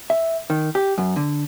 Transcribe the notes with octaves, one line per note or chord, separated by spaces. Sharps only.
E5
D#3
G4
F#2
D3